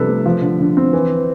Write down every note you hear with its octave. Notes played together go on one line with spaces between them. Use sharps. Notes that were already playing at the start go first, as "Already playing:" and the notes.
Already playing: C3 F3 G3 D4 A4 B4
A3
F3
D3
D3
C4
E3